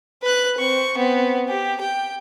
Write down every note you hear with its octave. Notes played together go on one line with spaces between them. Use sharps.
B4 F#6
C4 C#6
B3 C4
G4
G5